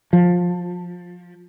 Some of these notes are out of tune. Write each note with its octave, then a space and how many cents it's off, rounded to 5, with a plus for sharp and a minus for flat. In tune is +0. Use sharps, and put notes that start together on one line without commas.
F3 +20